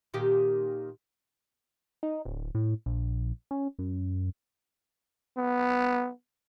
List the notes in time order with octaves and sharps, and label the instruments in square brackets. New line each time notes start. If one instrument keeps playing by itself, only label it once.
[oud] A#2 D#3 G4
[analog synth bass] D#4
D1
A2
A#1
C#4
F#2
[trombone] B3